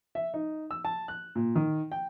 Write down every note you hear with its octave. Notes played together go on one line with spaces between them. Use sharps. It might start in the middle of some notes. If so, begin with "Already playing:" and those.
E5
D#4
E6
A5
F#6
A#2
D#3
G5